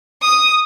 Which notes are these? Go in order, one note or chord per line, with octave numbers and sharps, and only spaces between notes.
D#6